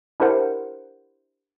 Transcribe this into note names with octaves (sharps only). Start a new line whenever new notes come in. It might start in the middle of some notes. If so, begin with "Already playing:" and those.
D4 E4 G4 A#4 C5 F#5